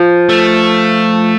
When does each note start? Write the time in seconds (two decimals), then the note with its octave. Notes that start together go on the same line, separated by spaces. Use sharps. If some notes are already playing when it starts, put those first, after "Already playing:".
Already playing: F3
0.29 A3